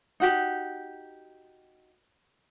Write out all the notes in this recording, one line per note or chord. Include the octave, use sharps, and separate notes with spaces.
D#4 F#4 G4